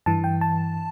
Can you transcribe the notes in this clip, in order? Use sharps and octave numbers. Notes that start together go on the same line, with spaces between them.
G2 E3 A5
G5
A5